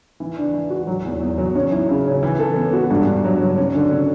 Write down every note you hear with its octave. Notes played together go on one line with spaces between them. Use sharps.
E3
D4
E3
F#4
F#3
E2
E2
F#3
C#4
E4
C#3
C#4
E3
A4
B3
F#4
G2
G2
F#3
F#3
C#4
D3
C#4